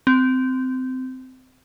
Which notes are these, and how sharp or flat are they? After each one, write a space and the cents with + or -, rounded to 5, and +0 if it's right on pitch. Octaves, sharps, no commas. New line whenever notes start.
C4 -20